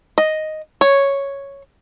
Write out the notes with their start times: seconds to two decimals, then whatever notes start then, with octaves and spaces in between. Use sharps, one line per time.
0.18 D#5
0.81 C#5